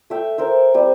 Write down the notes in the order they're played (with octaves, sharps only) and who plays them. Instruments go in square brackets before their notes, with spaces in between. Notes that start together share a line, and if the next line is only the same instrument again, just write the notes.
[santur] A3 E5 G5
A#4 C5 E5
G3 C4